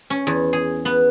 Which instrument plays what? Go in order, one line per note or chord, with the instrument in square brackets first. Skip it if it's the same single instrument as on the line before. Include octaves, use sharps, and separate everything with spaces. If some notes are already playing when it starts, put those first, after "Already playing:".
[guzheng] C#4
E2
G#4
B3